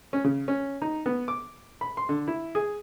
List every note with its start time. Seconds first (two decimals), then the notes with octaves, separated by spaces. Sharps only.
0.13 C#4
0.24 C#3
0.48 C#4
0.82 D#4
1.06 B3
1.28 D6
1.81 B5
1.97 C6
2.09 D3
2.27 E4
2.55 G#4